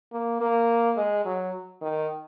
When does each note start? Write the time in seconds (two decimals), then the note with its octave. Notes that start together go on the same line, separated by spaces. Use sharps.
0.12 A#3
0.41 A#3
0.97 G#3
1.25 F#3
1.82 D#3